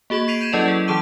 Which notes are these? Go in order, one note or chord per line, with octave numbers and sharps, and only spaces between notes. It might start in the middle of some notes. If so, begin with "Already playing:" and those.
A#3 F#4 G#4 C#6 G#6
G#6 B6 C7 D7 D#7 F7
G6 G#6 D#7 E7
F#3 C#4 E4 A4 D5 D#5
G#4
E3 G#4 A5 D6 D#7